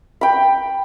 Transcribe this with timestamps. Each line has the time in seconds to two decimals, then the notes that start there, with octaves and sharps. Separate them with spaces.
0.21 G5 B5